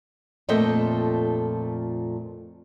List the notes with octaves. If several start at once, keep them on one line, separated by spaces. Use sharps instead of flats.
F2 A#2 A3 A4 D#5 G5